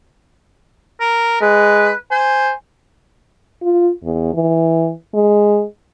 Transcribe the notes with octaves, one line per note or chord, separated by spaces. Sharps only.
A#4
G#3 B4
C5 G#5
F4
E2
E3
G#3